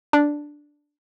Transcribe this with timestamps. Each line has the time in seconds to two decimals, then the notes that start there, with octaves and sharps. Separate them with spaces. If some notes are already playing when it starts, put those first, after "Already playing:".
0.13 D4